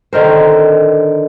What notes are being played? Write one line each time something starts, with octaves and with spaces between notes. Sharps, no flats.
D3 D#3 A#4 C5